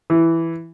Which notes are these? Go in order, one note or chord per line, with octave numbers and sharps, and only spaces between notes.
E3